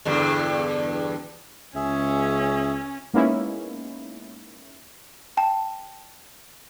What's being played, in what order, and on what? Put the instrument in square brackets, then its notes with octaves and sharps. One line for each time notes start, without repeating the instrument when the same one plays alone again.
[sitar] E2 G2 D3
[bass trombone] C#2 [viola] C#4 [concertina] G#4 E5
[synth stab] G#3 A#3 B3 C#4 D#4 E4
[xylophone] G5 A5